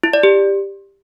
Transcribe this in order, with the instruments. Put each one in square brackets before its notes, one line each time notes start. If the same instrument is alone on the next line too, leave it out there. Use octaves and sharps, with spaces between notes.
[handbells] E4
D5
G4